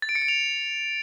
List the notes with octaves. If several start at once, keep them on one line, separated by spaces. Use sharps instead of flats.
A6
D7
C#7
D7
F7